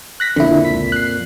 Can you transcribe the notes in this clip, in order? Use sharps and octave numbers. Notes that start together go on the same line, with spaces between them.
F#6 A#6 B6
F2 A#2 D3 E4
C#2 B6
F#6 C7